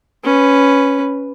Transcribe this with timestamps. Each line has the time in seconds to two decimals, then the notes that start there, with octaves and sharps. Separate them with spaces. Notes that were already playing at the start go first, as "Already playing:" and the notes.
0.24 C#4 B4